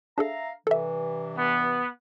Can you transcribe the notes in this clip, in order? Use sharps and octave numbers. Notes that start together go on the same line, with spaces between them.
D4 G#4 A4 E5 F5 A#5
G2 C3 E3 A4 E5
B3